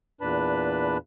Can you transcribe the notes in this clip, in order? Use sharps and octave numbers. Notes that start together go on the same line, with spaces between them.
E2 A#2 D4 B4 A5 B5